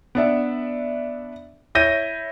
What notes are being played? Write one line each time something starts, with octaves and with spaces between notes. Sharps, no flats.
B3 D4 E5
E4 C#5 G6 A#6 D#7